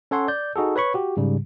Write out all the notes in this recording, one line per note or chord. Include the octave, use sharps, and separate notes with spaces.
C#4 A4 C#5 F#5 C6
D5 G6
D#4 F#4 G#4 A4
B4 C#5 B5 C#6
F#4 G4
G#2 C#3 G3